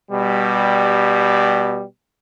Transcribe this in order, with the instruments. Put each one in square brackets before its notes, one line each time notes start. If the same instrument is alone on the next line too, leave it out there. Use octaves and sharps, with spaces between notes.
[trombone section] B2 G3